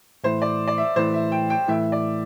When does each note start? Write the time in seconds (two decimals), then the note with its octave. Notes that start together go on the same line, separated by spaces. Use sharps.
0.24 A2 E3 A3 E4 C5
0.42 D5
0.68 D5
0.78 E5
0.96 A2 E3 A3 E4 C5
1.14 E5
1.32 G5
1.50 G5
1.68 A2 E3 A3 E4 E5
1.92 D5